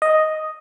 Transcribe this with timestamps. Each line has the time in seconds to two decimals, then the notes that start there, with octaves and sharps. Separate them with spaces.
0.02 D#5